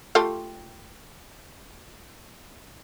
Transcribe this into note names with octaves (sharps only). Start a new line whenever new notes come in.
A3 F4 G4